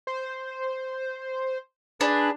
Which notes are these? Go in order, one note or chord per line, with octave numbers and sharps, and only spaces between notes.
C5
D4 G#4 B4